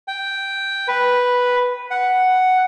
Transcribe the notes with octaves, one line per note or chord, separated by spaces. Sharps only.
G5
B4
F#5